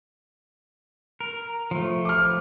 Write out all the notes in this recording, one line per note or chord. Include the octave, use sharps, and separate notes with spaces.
A#4
F3 A3
D6 F6